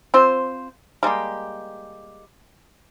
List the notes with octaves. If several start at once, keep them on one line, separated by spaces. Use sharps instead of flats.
C4 F4 C5
G3 G#3 A#3 G4